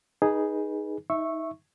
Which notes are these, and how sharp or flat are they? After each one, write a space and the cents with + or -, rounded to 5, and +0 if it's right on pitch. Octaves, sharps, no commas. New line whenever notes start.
D#4 +0 G#4 +0 B4 -25
D#4 +25 E5 +0 C#6 -10